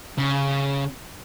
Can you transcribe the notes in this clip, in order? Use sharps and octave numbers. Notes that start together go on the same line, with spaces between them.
C#3